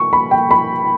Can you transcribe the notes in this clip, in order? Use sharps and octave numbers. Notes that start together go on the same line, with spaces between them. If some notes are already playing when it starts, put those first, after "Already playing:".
Already playing: C#6
B5
G5
B5